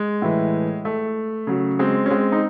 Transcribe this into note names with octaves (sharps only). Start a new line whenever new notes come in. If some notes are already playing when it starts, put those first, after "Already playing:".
Already playing: G#3
A2 E3
A3
C#3 F#3
G#3 C4
C#4
G#3 C4
D#4